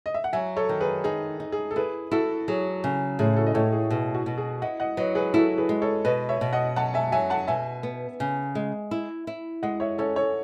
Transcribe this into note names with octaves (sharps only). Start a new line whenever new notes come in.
D#5
E5
F#5
F#3 E5 G#5
A4 C#5
D#3
G#4 B4
D#4 G#4
D#4
G#4
A4
E4 G#4 B4
E4 F#4 A4
F#3 G#4
C#3
A2 G#4
F#4 A4
D#5
A2 A4 C#5
G#4
B2 G#4
F#4
B2
G#4
E4 D#5 F#5
D#5 F#5
F#3 B4 D#5
G#4 B4
E4 F#4 A4
G#4 B4
G#3
A4 C#5
B2 B4 D#5
C#5 E5
B2
D#5 F#5
F#3 F#5 A5
E5 G#5
F#3 E5 G#5
F#5 A5
B2 E5 G#5
B3
C#3
G#3
E4
E4
G#3 D#5 F#5
C#5 E5
C#4 A4 C#5
A4 C#5